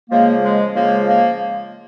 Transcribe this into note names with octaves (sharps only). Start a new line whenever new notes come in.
C#3 F3 G#3 A#3
G#3
C#3 F3 G#3 A#3
A#3